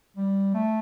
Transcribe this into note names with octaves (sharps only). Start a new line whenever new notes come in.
G3
A3